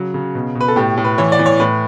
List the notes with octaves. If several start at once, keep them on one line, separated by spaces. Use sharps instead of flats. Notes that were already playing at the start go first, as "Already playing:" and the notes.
Already playing: C#3 F#3
C#3
B2
B2
B4
A4
A2 G4
A2
B4
E3 C#5
D5
E3
C#5
A2 B4